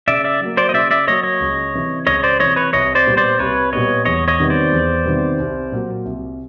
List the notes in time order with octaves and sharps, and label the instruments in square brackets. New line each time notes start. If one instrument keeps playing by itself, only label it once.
[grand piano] C#3 [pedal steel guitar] D5 E5
[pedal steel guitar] D5 E5
[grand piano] F#3 A#3
[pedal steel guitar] C5 D5
D#5
[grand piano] C#3 [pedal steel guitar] D5 E5
[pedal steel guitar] D5 E5
[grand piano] F#3 A#3 [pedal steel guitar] C#5 D#5
[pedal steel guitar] C#5 D#5
[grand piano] C#2
C3 E3
[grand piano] C#2 [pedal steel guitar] C#5 D#5
[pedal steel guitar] C5 D5
[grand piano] C3 E3 [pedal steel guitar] C#5 D#5
[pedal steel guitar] B4 C#5
[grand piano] C2 [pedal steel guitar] C#5 D#5
[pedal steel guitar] C5 D5
[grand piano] A#2 G3 B3
[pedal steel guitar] C5 D5
[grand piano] C2 [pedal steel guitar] B4 C#5
[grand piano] A#2 G3 B3 [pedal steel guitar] C#5 D#5
[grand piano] E2 [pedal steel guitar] C#5 D#5
[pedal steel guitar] C#5 D#5
[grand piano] C3 D#3 G3 B3
[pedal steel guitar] C5 D5
[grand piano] E2
C3 D#3 G3 B3
C2
A#2 F#3 A#3
C2